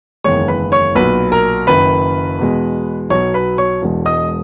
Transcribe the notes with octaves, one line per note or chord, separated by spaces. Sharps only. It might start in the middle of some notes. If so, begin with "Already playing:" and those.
F#1 E2 D#3 G#3 C#5 C#6
B4 B5
C#5 C#6
B1 A#2 F#3 B4 B5
A#4 A#5
F#1 F#2 D#3 B4 B5
E2 B2 G#3
B1 B2 F#3 C#5 C#6
B4 B5
C#5 C#6
E1 E2 B2 G#3
D#5 D#6